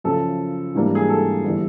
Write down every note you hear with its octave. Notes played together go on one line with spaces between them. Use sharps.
F#2 C#3 F3 A4
G#2 E3 G3 A#3 D4
G#4
A4
G1 E3 G3